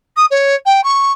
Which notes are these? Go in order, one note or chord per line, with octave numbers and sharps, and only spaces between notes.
D#6
C#5
G5
C#6